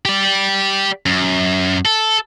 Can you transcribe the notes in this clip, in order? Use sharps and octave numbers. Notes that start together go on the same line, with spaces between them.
G4 D5
F#2
A4